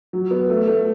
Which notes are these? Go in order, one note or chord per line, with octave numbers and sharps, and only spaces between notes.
F#3
B3
A3
A3